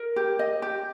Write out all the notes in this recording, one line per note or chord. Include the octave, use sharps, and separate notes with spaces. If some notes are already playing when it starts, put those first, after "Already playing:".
Already playing: A#4
G4
D#5
G4